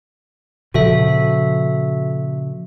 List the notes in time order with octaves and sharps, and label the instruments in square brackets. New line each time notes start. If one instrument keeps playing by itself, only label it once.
[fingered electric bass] A#2 C#3 F3 [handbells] F#4 A4 E5